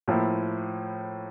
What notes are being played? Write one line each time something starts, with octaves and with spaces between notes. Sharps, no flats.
A2 F3 A#3 E4